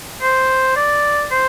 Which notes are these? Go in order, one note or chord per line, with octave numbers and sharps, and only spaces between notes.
C5
D5
C5